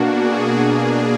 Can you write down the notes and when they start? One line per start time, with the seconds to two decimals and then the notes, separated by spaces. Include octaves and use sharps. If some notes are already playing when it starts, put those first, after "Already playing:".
Already playing: B2 A#3 D4 F#4
0.14 G#4
0.60 B2 A#3 D4